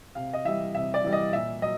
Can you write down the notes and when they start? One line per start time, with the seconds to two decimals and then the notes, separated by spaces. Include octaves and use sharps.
0.15 C3 F5
0.33 D#5
0.45 E3 G3 E5
0.75 C3 E5
0.94 D5
1.04 E3 G3
1.13 D#5
1.32 A#2 E5
1.62 F#3 D#5